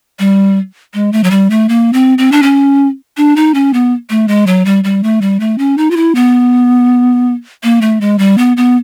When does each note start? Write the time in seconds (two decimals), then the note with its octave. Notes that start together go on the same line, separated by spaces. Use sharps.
0.19 G3
0.94 G#3
1.13 A3
1.24 F#3
1.31 G3
1.50 A3
1.69 A#3
1.93 C4
2.18 C4
2.32 D4
2.43 C#4
3.17 D4
3.36 D#4
3.54 C#4
3.73 B3
4.10 A3
4.28 G#3
4.47 F#3
4.65 G3
4.84 G3
5.03 A3
5.21 G3
5.40 A3
5.58 C#4
5.78 D#4
5.91 F4
5.97 E4
6.15 B3
7.64 A#3
7.81 A3
8.01 G#3
8.19 G3
8.38 B3
8.57 B3